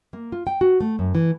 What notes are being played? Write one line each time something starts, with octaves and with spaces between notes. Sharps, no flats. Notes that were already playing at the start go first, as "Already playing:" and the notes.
A#3
F4
G5
F#4
A3
F#2
E3